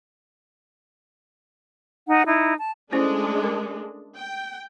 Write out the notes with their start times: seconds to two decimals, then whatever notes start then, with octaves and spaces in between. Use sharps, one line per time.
2.07 D#4 F#5
2.26 D#4 E4
2.59 A5
2.93 G#3 A3 C#4 D4 E4 C5
3.44 A#4
4.17 G5